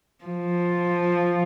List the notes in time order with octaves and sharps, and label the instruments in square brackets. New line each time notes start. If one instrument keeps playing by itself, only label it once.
[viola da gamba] F3